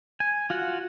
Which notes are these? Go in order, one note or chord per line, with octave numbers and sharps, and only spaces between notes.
G#5
F4 F#4 F#5